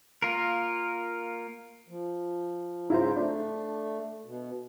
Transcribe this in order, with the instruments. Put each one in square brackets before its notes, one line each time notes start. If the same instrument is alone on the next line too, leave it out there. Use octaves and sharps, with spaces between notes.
[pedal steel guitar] A#3 F4 A#4
[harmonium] F3
[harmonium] G#2 C#3 A#5 [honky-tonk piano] E4 F4 C5
[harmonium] A3 [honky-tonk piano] D4
[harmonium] B2